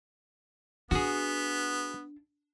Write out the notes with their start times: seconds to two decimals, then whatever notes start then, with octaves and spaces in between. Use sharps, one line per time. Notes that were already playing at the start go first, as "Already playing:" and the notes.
0.91 B3 D4 F#4 G#4